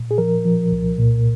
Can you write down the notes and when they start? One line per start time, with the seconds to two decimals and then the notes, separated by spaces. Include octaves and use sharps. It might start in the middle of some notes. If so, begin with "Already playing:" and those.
Already playing: A#2
0.11 G#4
0.18 F3 A#4
0.45 F3
0.72 C2
0.98 A#2